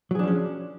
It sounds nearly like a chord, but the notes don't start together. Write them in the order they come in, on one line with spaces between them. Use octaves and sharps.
F#3 G#4 D4 F3 C#4